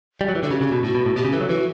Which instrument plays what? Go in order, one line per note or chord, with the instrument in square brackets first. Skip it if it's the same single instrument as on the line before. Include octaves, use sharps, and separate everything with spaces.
[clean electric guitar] G3
F#3
E3
[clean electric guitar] D3 [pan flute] F#4
[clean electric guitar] C#3 [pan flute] G4
[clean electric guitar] C#3 [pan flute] G4
[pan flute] F#4
[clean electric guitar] B2
[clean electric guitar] A2 [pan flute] F#4
[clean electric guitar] B2
A2
[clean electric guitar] B2 [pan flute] G4
[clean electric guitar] C#3
[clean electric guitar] E3 [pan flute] A4
[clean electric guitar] F#3
[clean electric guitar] E3 [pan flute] F#4